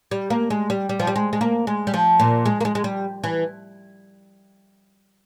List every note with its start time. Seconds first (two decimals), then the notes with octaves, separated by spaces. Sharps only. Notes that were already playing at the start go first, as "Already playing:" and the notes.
0.11 G3
0.30 A#3
0.50 G#3
0.70 G3
0.89 G3
1.00 F3
1.07 G3
1.16 G#3
1.33 G#3
1.41 A#3
1.67 G#3
1.87 G3
1.94 F3
2.20 A#2
2.46 G#3
2.61 A#3
2.65 G#3
2.75 G#3
2.84 G3
3.24 E3